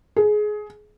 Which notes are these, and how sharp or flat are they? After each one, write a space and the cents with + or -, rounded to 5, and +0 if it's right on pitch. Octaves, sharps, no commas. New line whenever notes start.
G#4 +20